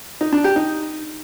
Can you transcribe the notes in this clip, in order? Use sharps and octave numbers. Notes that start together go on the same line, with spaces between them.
D#4
D4
G4
D#4